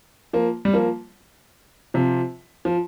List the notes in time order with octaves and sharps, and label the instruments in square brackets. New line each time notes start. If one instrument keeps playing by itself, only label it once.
[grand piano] F3 A#3
G3
F3 A#3
C3 F3
F3